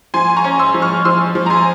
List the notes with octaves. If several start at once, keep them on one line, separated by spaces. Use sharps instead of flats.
F3 G#5 C6
C6
A#5 C#6
C#4
C6 E6
F3
C#6 F6
F3 C6 E6
F3
A#5
G#5 C6